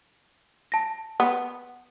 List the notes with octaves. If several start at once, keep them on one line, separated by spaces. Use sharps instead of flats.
A5 A#6
B3